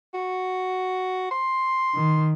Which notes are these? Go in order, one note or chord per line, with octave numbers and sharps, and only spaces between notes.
F#4
C6
D#3